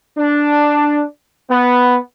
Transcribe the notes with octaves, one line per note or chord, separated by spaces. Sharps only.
D4
B3